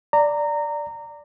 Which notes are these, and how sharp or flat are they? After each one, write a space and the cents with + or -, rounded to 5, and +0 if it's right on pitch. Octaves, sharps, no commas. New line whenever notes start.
D5 +0 A#5 -20